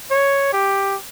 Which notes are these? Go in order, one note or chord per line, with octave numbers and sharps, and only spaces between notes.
C#5
G4